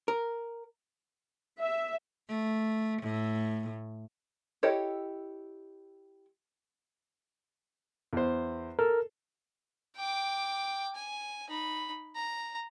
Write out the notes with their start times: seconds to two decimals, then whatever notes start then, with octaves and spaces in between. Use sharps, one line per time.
0.08 A#4
1.58 E5
2.29 A3
3.02 A2
4.63 E4 G4 A4 C#5 D#5
8.13 E2 C5
8.79 A4 A#4
9.97 G5 D6
10.95 G#5
11.50 D#4 B5
12.15 A#5